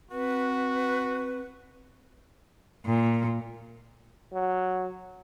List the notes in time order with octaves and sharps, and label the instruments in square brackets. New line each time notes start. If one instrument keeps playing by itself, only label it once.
[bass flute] C4 [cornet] F#4 [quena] B4
[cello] A#2
[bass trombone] F#3